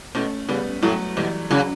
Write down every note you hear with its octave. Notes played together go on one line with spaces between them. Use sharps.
B2 A3 C#4
C#3 G3 B3
A2 F#3 A3
B2 E3 G3
C#3 F#3